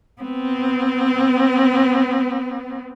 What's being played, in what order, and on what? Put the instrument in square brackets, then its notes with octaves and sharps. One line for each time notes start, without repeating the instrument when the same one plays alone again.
[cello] B3 C4